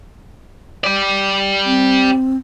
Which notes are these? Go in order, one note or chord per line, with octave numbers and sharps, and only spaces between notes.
G4 D5
C4